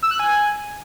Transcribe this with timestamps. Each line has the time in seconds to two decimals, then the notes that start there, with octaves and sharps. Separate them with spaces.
0.03 E6
0.11 F#6
0.19 G#5